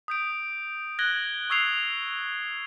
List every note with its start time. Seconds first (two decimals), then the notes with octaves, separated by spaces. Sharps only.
0.08 D#6 G6 D7
0.99 F#6 G#6 A#6 F#7 G7
1.50 C#6 D#6 E6 G#6 C7 F7